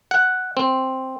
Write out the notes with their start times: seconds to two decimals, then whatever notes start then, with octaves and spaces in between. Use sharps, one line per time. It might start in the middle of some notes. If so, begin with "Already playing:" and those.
0.11 F#5
0.57 C4